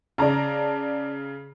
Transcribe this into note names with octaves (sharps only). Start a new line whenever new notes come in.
C#3 D5 A5 A#5